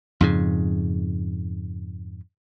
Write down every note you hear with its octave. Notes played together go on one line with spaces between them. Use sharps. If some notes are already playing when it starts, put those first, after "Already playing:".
F2 G#2 C#3